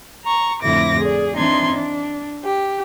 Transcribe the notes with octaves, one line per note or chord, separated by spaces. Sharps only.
A#5 C#6
F2 A2 D3 E4 D6 A#6
G#4 D5
E3 C4 D4 D#4 C6 G#6
D4
G4